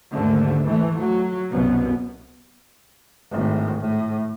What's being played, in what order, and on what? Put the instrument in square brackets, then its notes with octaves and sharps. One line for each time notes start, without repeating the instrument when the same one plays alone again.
[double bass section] D#2 G#2 D3 A3
E3 A3
F#3
C2 F#2 B2 B3
[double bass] G#1 A2
A2